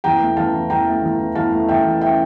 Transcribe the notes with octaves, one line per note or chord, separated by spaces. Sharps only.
E2 G5 A#5
A3
E2 F5 A5
E3
E2 G5 A#5
A3
E2
E3
E2 F5 A5
A3
E2 E5 G5
E3
E5 G5